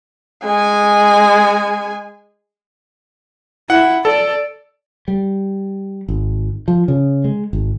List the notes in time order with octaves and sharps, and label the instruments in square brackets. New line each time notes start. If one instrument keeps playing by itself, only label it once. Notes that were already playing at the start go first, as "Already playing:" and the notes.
[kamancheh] G#3 G#5
[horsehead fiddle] E4 [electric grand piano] F#5
[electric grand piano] A4 [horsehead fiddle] D5
[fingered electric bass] G3
G#1
F3
C#3
G#3
G#1